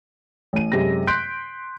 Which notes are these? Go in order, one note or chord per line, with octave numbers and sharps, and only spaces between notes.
A1 D#7
F#2 C3 G#3 A#6
C6 F#6 G6 B6 D7